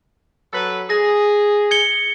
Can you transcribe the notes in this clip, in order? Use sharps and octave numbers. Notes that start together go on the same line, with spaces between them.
F#3 A4 B4
G#4 A#6
G#6 C#7 G7